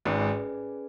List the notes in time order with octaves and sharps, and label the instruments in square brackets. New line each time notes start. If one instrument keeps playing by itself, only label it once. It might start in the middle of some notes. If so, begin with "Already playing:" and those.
[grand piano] G#1 G#2 [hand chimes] C#4 G#4 B4 D5 G#5